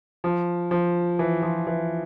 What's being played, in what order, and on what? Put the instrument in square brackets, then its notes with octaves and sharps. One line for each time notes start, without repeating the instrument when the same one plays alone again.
[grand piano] F3
F3
E3
F3
E3